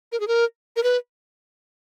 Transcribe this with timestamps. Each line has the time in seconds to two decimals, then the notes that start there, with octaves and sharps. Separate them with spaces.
0.12 A#4
0.20 G#4
0.28 A#4
0.76 A#4
0.83 B4